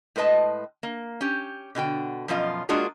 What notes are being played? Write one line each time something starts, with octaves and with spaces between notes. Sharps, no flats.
A2 G#3 B4 D#5 A5
A#3
C#4 G4
B2 D3 F#4 G5
F#2 B2 F3 F4 D#5
G#3 A#3 D4 F4 F#4 G#4